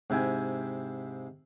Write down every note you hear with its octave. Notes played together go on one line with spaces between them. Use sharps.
G#2 C3 E4 G5 G#5